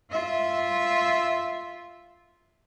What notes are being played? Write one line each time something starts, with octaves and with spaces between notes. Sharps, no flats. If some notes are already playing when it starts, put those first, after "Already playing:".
F4 E5